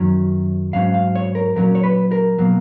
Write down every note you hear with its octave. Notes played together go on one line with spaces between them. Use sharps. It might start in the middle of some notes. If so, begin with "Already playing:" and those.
Already playing: F#2 D#3 F#3 C#4
G#2 F#3 C#4 F5
F5
C#5
A#4
A#2 F#3 C#4 A#4
C#5
B4
A#4
B2 F#3 A#3